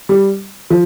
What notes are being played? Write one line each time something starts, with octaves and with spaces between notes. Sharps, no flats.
G3
F3